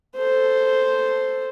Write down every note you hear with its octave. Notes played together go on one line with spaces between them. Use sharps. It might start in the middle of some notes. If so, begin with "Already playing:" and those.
A4 C5